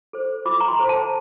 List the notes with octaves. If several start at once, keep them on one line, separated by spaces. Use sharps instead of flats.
A4 C5
F4 D6
A#5
C6
A4 C5
A5